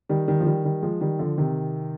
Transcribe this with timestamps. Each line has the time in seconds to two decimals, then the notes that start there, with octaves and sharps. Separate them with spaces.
0.09 D#3 G3
0.27 D#3 G3
0.40 F3
0.46 D#3 G3
0.65 D#3 G3
0.82 F3 G#3
1.01 D#3 G3
1.19 D3 F3
1.38 C3 D#3